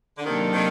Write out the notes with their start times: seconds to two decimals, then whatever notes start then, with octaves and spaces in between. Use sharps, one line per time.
0.17 D3
0.25 C3 D#3 F#3 A#3 D4 A4
0.53 C3 D#3